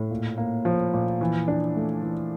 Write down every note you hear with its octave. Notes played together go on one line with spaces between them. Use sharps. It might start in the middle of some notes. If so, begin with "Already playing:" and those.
Already playing: A2
A#2
A#3
F3
A#2
E3
D4
A3
E3